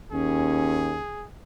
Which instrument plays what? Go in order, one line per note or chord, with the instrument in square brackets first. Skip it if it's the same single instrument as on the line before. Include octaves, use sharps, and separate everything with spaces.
[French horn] D#2 [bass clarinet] C#4 [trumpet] G#4